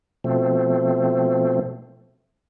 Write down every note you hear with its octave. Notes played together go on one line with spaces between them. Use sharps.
B2 F3 A3 C4